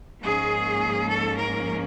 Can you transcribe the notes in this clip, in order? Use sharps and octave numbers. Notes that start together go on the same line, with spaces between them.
G#2 F3 A#3 C#4 G#4
A4
A#4